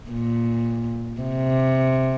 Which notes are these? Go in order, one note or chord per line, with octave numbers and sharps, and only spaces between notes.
A#2
C3